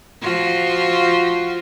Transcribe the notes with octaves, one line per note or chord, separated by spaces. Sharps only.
F3 F4 F#4